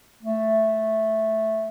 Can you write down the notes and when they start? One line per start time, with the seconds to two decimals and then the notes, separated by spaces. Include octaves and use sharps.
0.23 A3